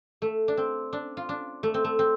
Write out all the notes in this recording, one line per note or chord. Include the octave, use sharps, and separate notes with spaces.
A3
D4
C4
D4
F4
D4
A3
C4
A3
C4